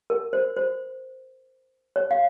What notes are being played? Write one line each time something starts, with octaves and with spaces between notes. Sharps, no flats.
A#4
C5
C5
C#5
F5